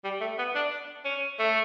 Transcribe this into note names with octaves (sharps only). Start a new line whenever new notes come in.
G3
A3
B3
D4
C#4
A3